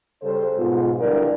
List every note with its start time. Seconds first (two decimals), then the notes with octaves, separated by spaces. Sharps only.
0.22 C#3 G3 A4 C5
0.57 G#2 B2 F4
1.00 G2 D3 F#3 E4 A#4 D5